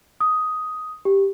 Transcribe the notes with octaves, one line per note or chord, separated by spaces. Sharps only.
D#6
G4